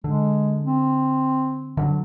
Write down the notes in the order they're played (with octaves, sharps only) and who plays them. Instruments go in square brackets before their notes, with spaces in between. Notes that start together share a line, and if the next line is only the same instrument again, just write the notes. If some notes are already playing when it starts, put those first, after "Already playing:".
[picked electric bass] D3 [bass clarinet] G#3
[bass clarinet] C4
[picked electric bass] D3 F3 F#3